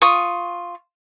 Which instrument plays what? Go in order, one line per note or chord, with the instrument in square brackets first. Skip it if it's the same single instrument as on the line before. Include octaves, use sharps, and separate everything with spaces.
[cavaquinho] F4 C#6 D#6